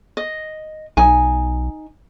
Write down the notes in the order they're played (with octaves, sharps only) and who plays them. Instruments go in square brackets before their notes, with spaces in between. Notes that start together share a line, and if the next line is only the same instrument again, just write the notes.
[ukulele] D#5
[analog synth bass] B1 [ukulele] D#4 G#5